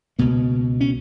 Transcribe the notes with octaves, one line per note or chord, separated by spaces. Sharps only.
C#2 B2 A#3
C#4